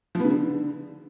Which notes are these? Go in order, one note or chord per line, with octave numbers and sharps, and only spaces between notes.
F3
B3
C#3
D3